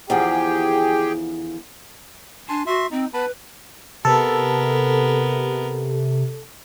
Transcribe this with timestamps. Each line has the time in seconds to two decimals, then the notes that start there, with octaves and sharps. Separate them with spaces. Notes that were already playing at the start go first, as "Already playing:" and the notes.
0.10 E2 D3 F3 G4 G#4 G5
2.49 D4 G#5 A5 C6
2.67 F#4 E5 C6
2.91 C4 D#4
3.14 B3 B4 A5 B5
4.05 C3 B3 A4 A#4